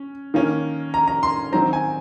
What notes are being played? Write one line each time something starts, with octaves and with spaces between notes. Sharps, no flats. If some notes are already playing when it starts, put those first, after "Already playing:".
Already playing: C#4
D#3 A#3 C#4
A#5
A#5
C6
D#3 F#3 C4 A#5
G#5